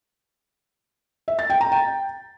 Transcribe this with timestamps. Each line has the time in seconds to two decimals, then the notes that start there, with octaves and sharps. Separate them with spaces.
1.28 E5
1.39 A6
1.50 G5
1.61 A#5
1.72 G5